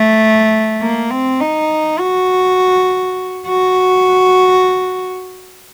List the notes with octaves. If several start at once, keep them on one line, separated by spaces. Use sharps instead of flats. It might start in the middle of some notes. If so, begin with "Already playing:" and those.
Already playing: A3
A#3
C4
D#4
F#4
F#4